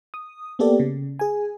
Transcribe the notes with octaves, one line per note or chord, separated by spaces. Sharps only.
D#6
A#3 B3 G4 A4 D5
C#3
G#4 G#5